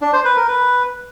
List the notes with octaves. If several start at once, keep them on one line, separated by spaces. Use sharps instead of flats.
D4
C5
B4
A#4
B4